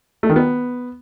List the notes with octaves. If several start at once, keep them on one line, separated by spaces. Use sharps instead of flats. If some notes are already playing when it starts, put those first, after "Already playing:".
A3
D#3
B3